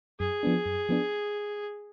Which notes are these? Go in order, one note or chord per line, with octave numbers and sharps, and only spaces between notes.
F#2 G#4
F3 B3 D4
F#2
F3 B3 D4